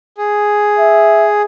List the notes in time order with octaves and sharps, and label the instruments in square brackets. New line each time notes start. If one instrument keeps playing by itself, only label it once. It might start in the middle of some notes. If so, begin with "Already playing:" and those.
[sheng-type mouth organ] G#4
[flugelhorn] E5